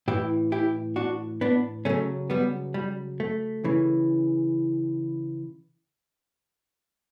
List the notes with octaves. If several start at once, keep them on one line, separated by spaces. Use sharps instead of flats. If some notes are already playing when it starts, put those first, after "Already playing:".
A2 E3 E4 G4
E4 G4
D4 F#4
B3 D4
C#3 F#3 A3 C#4
G3 B3
G3
A3
C#3 E3